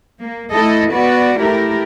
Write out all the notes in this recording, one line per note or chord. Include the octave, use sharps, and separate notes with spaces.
A#3
A3 E4 A4 D#5
B3 F#4 B4 D5
A3 E4 G4 A#4